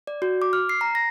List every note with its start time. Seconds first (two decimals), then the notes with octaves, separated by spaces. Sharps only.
0.07 D5
0.22 F#4
0.42 D6
0.53 F6
0.69 C7
0.81 A#5
0.95 A#6